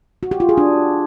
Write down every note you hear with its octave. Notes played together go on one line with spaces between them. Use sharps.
F#4
G4
F4
G#4
D4